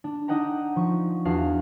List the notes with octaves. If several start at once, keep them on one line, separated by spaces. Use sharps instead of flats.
D4
D4 D#4 D#5 F#5 G5 A#5
F3 C#6
E2 D4 F#4 F5